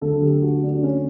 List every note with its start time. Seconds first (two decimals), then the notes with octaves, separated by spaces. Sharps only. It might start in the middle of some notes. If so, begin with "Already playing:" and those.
0.01 D2 D3 F#3 A3 A4
0.22 G4
0.42 F#4
0.63 D4
0.83 C#4